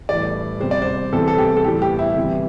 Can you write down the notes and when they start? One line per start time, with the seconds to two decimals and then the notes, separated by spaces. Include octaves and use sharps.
0.09 A2 E3 G3 D5
0.60 C3 G3 C5
0.71 D5
0.82 C5
1.13 C3 E3 G3 A4
1.28 A4
1.38 G4
1.57 A4
1.64 A2 E3 G3 G4
1.82 G4
1.99 E4
2.17 C3 E3 G3